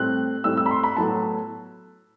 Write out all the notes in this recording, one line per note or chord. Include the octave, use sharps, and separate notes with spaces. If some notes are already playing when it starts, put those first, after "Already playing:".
Already playing: A2 G3 C4 F#6
A2 G3 C4 E6
E6
B5
C6
B5
A2 F#3 B3 A5